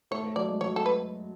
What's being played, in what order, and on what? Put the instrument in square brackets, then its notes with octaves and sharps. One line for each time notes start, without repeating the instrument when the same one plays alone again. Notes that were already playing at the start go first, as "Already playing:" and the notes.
[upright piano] A3 [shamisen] C#5
[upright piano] A3
[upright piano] F#3 [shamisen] D5
[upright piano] G#3
[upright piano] F#3 [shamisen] C#5
[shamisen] A4
B4